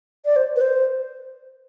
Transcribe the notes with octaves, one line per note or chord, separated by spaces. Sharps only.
D5
C5
B4
C5